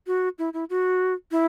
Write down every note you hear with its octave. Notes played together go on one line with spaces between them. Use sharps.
F#4
E4
E4
F#4
E4